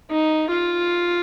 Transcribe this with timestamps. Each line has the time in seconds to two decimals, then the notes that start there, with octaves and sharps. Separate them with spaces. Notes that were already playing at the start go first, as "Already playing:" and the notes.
0.10 D#4
0.50 F4